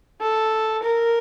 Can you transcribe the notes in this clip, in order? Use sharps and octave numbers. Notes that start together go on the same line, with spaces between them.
A4
A#4